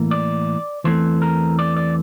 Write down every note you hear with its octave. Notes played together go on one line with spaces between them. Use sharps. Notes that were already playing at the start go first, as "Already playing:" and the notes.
Already playing: A2 E3 A#3
D5
E2 E3 A3 C4 C5
A#4
D5
D5